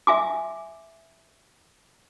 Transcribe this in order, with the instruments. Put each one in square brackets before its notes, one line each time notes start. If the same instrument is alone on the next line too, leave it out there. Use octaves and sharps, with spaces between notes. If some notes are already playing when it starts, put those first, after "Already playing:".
[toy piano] E5 G#5 D6